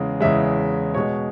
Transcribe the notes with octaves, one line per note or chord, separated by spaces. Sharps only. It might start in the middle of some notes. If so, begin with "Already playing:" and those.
Already playing: E2 C#3 G#3
E2 C#3 G#3 E5
B2 G#3 C#5